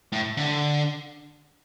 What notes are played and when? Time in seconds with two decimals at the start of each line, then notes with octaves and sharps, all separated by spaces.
0.12 A2
0.37 D3